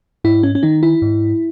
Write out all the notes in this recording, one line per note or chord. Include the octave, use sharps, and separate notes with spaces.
G#2 E4
C#4
C#4
D#3 D#4
E4
G#2